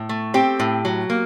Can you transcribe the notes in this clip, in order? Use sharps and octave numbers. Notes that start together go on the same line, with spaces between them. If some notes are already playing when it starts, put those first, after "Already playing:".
Already playing: A2
A3
C4 G4
A2
F#3
A#3